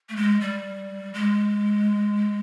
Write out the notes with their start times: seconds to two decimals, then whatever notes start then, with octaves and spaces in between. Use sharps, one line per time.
0.09 A3
0.16 G#3
0.41 G3
1.14 G#3